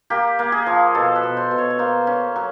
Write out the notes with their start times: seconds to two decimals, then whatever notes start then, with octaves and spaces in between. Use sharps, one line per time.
0.10 A#3 G4
0.39 A#3
0.52 G#4
0.67 F3
0.95 B2 A4
1.15 B4
1.23 B2
1.37 C5
1.51 B2
1.58 C#5
1.70 C#5
1.79 A#3 C5
2.07 C#4
2.36 F#3